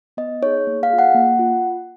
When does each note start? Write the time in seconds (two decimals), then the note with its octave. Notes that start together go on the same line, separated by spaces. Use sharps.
0.17 B3 D#5
0.42 D#4 G#4 C#5
0.67 A#3
0.83 F5
0.90 F4 G#4
0.99 F#5
1.14 A#3
1.39 F4